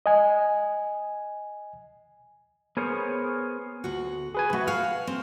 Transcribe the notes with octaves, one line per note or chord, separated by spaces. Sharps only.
D#5 G#5
B3 G#4 A#4 C5 C#5
D2 F#4
G#4 B4 G#5
C3 A3 F#4 B4
F#4 F5 F6
C4